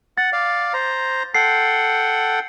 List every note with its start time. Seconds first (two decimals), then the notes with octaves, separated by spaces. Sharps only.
0.18 F#5 A6
0.33 D5 F5
0.74 C5 A#5
1.35 A4 F#5 G5 C7